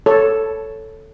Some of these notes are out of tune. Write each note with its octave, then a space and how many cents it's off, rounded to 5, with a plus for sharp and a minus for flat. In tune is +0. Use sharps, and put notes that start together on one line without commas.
A4 +0 C#5 +0